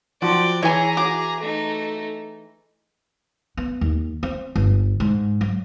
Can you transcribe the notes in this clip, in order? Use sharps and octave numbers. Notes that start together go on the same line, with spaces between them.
F3 F#3 F#4 D5 G5
E3 E4 G#4 C#5 G#5 A#5
F#4 D6
A3 D#4
B3
D#2
C4
G1
G#2
F#3